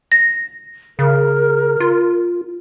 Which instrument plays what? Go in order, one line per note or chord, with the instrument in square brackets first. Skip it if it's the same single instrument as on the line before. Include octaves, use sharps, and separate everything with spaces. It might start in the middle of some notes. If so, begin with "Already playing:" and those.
[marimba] A#6
[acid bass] C#3 [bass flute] A#4
[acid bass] F4